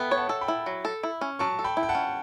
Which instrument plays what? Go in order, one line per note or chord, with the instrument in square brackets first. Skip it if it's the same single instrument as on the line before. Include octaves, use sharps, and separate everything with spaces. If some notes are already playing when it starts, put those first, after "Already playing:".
Already playing: [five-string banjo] B3 [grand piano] A4 E5 G5 A5
[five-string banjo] C#5
[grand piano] F#5 A5
[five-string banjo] A4
[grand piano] G5 B5
[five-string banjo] E4
F#3
A4
E4
C#4
[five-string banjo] F#3 [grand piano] A5 C#6
[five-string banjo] A4
[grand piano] G5 B5
[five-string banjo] E4
[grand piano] G5
F#5 A5
[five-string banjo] C#4